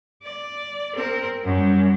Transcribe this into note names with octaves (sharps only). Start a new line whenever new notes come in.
D5
C4 A#4
F#2 G3